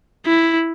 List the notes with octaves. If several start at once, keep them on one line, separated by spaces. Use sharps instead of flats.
E4